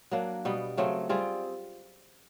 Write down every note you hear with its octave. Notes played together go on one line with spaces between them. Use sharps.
F#3 A#3 D4
B2 G3 B3
C#3 F#3 A3 C4
G3 C4 F4 G#4